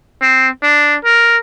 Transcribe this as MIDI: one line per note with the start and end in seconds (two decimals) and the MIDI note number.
0.22 0.49 60
0.63 0.95 62
1.05 1.37 70